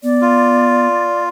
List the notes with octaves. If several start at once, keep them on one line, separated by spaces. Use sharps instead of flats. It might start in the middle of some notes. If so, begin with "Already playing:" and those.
B3 D5
F4